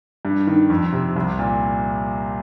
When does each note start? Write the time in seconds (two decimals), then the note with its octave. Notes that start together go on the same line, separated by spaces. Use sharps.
0.25 G2
0.47 D#3
0.70 F2
0.92 C3
1.16 C2
1.39 A#2